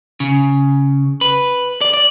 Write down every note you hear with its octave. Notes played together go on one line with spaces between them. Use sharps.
C#3
B4
D5
D5